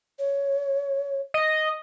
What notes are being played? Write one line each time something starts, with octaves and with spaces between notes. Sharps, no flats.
C#5
D#5